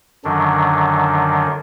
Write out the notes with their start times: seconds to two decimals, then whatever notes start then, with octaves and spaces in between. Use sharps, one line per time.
0.25 F#2 D3 D#3 F#3 D4